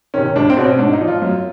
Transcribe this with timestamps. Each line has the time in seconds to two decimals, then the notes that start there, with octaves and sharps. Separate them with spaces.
0.14 C3 D#3 C#4
0.36 C#2 D4
0.50 C4
0.57 B2
0.64 C#4
0.78 G#2 D4
0.93 D#4
1.00 F3
1.07 F4
1.22 F#2